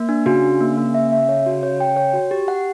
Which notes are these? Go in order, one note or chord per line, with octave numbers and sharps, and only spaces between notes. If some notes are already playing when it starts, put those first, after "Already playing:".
Already playing: A#3
D4
C#3 F#4
D4
A#3
A#3
E5
E5
C#5
F#4
C#5
G5
C#5
F#4
G4
F#5